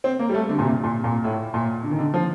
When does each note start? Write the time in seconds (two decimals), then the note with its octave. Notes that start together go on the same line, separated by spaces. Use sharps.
0.04 C4
0.19 A#3
0.29 G3
0.34 A3
0.49 D3
0.59 A#2
0.64 C3
0.84 A#2
1.04 A#2
1.24 A2
1.54 A#2
1.83 D3
1.91 D#3
1.99 D3
2.14 F3